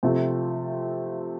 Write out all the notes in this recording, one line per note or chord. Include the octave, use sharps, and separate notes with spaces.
C3 F3 A3 C4 F4